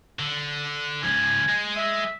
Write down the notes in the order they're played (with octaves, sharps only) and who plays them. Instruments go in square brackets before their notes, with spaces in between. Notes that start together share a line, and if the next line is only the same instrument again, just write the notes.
[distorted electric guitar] D3
[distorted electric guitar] C#2 F3 [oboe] G#5
[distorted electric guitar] G#3
[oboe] E5